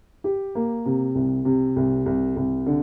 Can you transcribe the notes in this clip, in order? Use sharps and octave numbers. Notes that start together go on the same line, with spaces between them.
G4
A#3
C3
C2
C3
C2
C2
C2
D3